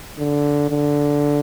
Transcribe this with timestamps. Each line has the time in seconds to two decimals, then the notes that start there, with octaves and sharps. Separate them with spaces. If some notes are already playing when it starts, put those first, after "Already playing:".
0.19 D3
0.70 D3